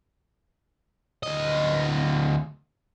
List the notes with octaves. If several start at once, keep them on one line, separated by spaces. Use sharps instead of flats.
D2 D#5